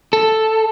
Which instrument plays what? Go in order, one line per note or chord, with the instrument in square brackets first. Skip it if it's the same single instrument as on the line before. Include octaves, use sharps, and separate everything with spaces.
[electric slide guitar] A4